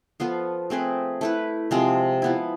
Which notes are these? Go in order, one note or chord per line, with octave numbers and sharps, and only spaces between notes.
F3 B3 F4 A4
A3 C4 G#4 B4
A3 E4 B4
C3 F3 G#3 C4
F3 B3 E4